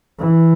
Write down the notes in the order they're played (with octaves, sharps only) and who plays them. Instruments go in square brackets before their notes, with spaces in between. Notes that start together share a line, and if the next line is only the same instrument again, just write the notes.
[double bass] E3